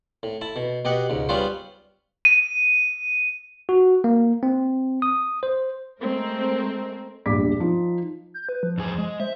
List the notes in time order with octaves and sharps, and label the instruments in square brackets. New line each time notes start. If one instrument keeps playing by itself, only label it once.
[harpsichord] A2
E4 A5
B2
B2 G4 D#5 F#5
C#2 G#2
G3 B3 C#4 F4 B4 C5
[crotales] D#7
[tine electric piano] F#4
A#3
C4
D#6
C5
[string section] G#3 A3 C4 A#4
[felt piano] E1 A#1 G2 D6 B6
F3 D#4 F4
[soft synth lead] G6
B4
F3
[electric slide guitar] E2 G#4 C5
G#3
[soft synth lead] C5 [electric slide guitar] E5